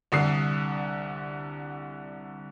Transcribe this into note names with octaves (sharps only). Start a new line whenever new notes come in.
C2 D3 D#6 C7